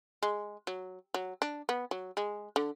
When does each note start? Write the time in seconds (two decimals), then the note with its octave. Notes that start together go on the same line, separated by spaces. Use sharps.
0.23 G#3
0.67 F#3
1.14 F#3
1.42 D4
1.69 B3
1.91 F#3
2.17 G#3
2.56 D3